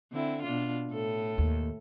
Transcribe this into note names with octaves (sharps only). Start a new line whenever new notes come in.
D3 C4 E4
B2 D4 F4
A2 A4
D#2